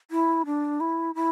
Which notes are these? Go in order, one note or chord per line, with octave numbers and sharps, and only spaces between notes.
E4
D4
E4
E4